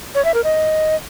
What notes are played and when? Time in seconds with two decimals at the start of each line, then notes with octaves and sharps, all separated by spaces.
0.15 C#5
0.25 E5
0.34 A#4
0.44 D#5